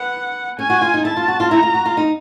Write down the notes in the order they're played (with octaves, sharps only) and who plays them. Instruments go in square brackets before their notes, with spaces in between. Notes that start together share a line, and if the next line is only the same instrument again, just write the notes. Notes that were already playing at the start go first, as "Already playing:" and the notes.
Already playing: [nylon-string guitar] B3 [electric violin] F#5
[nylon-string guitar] C#4 [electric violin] G#5
[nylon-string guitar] F#4
F4
D#4
[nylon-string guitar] E4 [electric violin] A5
[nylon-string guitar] F4
F#4
F4
[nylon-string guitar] E4 [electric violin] A#5
[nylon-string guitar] F4
F#4
F4
D#4